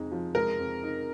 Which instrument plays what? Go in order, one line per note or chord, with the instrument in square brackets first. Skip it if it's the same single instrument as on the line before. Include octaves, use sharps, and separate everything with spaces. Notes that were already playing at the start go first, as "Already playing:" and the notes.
Already playing: [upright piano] F2 G#3 D#4
F3
[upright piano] G#3 [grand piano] A#4
[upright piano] F2
D#4